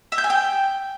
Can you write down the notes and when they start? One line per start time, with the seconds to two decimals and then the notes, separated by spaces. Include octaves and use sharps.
0.12 E5
0.18 G6
0.24 G#5
0.30 G5